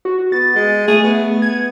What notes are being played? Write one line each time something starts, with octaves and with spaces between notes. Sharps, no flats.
F#4
B3 A6
G#3
A3 G#4
B3
G#6